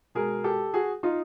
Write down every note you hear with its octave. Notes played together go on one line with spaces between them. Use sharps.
B2 G#3 G#4 A#4
G4 A4
F#4 G#4
D#4 F4